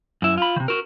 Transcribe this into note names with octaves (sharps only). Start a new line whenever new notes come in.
F#2 E4
F4 B5
C3 D#3
F#4 A#4